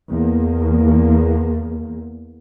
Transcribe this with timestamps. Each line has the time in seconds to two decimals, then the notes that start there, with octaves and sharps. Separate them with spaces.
0.11 E2 A#3